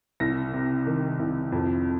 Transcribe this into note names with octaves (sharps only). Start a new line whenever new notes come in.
C2 A#6
C3
D#3
C2
F2